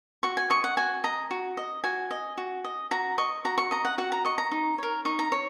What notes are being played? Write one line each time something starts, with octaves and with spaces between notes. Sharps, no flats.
F#4 C#6
G#5
D#5 C#6
F#5
F#4 G#5
D#5 A#5
F#4
D#5
F#4 G#5
D#5
F#4
D#5
F#4 A#5
D#5 C#6
F#4 A#5
C#6
D#5 A#5
F#5
F#4 F#5
A#5
D#5 C#6
A#5
D#4
A#4 C#5
D#4 C#6
A#5
C#5